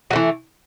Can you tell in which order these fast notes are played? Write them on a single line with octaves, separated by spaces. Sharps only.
F#3 A3 E3